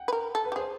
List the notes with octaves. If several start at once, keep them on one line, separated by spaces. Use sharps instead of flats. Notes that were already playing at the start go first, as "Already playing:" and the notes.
Already playing: F#5 G5
B4
A#4
A4
B4
G4
G#4 C5